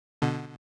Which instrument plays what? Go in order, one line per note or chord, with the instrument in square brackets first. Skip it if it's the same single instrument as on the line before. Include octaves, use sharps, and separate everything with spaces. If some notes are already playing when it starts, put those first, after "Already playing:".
[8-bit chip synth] B2 D3